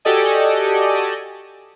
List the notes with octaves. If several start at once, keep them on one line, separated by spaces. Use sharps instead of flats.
F#4 G4 A4 D5 D#5 G#5